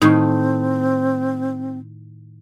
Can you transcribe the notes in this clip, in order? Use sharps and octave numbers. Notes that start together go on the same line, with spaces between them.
A2 D#3 C4 D#4 C#6